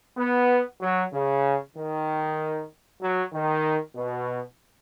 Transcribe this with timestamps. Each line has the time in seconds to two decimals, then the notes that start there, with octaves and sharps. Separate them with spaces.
0.17 B3
0.81 F#3
1.12 C#3
1.75 D#3
3.01 F#3
3.33 D#3
3.96 B2